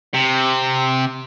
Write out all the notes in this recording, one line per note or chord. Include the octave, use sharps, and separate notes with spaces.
C3